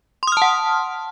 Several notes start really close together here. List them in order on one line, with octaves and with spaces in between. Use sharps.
C6 D#6 F6 A5 F#5